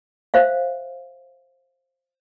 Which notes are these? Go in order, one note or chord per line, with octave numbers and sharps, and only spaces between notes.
C5 E5 F5